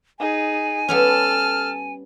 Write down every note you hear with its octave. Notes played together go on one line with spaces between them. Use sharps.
D#4 G#4 G#5
G3 B3 C#4 A4 A5 F6